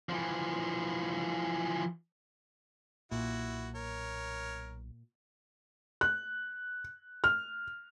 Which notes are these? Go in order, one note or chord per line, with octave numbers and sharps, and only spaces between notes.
E3 F3
B1 A#2 E4 F#4
A#4 C#5
F#6
F6